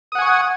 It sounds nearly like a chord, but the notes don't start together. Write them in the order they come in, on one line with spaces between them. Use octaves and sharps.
D#6 F#5 G#5 C#6